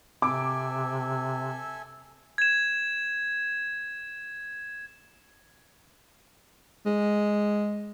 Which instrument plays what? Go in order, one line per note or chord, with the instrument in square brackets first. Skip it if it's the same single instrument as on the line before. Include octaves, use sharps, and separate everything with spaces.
[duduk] C3 [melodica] A4 E5 G#5 [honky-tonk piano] D6
[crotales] G#6 E7
[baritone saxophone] G#3